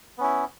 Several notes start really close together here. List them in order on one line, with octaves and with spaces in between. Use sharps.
B3 C#4 E4